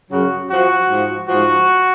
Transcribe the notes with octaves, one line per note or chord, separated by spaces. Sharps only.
F#2 C#3 F#3 F#4
F#2 F3 F#4
G#2 F3
G#2 F3 F#4